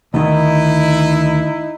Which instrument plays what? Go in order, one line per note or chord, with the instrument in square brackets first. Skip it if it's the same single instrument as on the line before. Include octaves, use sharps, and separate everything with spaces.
[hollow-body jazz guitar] D2 D#3 [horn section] D#4 E4